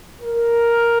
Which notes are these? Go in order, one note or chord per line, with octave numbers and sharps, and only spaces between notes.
A#4